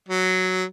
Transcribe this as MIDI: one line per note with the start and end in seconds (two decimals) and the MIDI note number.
0.09 0.65 54